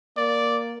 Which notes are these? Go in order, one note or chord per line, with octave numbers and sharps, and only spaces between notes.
A#3 D5